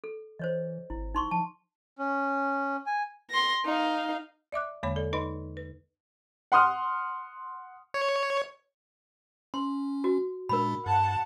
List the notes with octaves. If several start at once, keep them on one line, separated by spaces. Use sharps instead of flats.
A4
E3 C5 C#5 D#5
G#1 E4
D#4 C6 C#6
F3 A5
C#4
G#5
C6 A#6
D#4 F5
D5 E5 D6 F#6
E2 D3 G#3 A#3 C#5 B5
A4 D5
D#4 B4 D#5 B5 C6
B4
F#5 C6 D#6 F6
C#5
C#4 C6
F#4
A#2 G#3 D4 A#4 B5
G2 F#5 A5